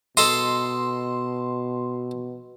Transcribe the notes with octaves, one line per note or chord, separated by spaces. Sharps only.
B2 A4 D#5 C6